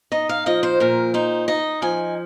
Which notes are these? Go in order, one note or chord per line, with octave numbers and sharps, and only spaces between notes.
D#4 D#5
F5
F3 D#5
C5
A#2 A#4
D#4 C5
D#4 D#5
F3 G#5